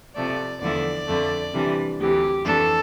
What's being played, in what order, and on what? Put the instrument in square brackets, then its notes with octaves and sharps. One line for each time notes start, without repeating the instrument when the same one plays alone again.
[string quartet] C3 F3 A3 D5
E2 D3 F3 A3 E4 D5
F2 D3 A3
C3 E3 G3 D4
D2 C3 E3 G4
F2 E3 A3 D4 A4